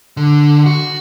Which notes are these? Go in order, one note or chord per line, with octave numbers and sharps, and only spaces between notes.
D3
F#4